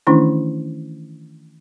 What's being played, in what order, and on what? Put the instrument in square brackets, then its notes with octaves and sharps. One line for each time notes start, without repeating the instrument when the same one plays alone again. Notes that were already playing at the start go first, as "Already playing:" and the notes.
[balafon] D#3 E3 A3 C#4 D4 E4